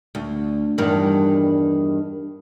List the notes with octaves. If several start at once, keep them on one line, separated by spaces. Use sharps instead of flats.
D2
E2 G2 D#3